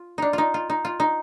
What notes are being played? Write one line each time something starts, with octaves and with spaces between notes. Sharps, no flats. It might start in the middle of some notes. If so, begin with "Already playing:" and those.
Already playing: F4
D4 D#4
D#4 F4
F4
D#4
F4
D#4